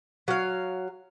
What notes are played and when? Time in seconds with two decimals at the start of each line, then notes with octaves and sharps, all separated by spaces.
0.28 F#3 F5